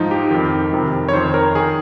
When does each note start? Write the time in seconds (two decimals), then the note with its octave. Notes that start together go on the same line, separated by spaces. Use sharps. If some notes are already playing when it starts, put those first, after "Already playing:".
Already playing: G#2 F3 D#4
0.11 G4
0.31 F2 D#3
0.73 F2 C3 D#3
1.08 C#5
1.13 F2 D#3 C5
1.34 A#4
1.55 D#3 G#4